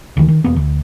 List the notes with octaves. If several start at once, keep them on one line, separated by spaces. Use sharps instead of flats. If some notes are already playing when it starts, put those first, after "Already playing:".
D2 D#3
D#3
E1 A#3 B3
D2